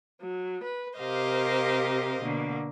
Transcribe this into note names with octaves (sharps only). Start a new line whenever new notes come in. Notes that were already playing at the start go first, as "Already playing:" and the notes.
F#3
B4
C3 G4 A#4 C5 D#5 F5
B2 D3 A#3